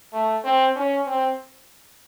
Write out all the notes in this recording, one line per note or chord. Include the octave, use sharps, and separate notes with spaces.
A3
C4
C#4
C4